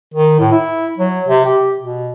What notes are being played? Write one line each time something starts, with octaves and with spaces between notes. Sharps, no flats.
D#3
A2
E4
F#3
C3
G4
B2